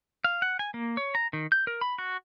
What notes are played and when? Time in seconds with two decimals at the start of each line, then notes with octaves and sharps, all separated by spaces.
0.24 F5
0.42 F#5
0.59 G#5
0.74 A#3
0.97 C#5
1.15 A#5
1.33 D#3
1.52 G6
1.67 A#4
1.81 B5
1.98 F#4